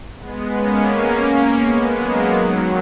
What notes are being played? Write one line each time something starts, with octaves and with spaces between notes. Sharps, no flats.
G#3 B3
A#3 C#4
A#3 C#4
G#3 B3
F#3 A#3
D#3 F#3